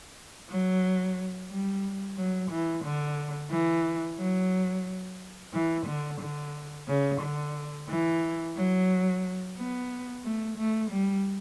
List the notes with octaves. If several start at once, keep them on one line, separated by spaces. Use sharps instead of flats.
F#3
G3
F#3
E3
D3
E3
F#3
E3
D3
D3
C#3
D3
E3
F#3
B3
A3
A3
G3